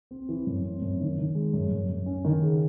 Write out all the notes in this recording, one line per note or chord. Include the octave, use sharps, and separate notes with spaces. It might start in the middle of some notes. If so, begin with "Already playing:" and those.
C4
E3
F#2
C4
F#2
D#3
D#3
G#3
F#2
F#2
F#2
C#4
D#3
C#3